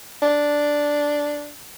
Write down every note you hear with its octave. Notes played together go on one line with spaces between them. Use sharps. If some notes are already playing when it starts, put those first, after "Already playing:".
D4